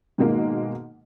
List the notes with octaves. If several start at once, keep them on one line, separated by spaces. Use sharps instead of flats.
G#2 B2 D#3 G#3 A#3